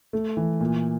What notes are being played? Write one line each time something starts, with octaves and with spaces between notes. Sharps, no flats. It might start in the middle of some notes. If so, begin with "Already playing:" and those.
A3
E3
A#2